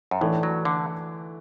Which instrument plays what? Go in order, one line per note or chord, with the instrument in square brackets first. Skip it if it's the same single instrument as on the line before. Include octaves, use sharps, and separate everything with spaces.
[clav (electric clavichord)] F#2
[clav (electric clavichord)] A2 [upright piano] E3 A3 D4
[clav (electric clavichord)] F#3
D3